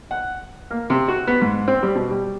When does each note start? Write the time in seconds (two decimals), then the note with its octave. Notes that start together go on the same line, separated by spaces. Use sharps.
0.11 F#5
0.71 A#3
0.90 C3
1.08 F#4
1.27 B3
1.41 G#2
1.68 C4
1.83 G3
1.95 B2
2.11 G3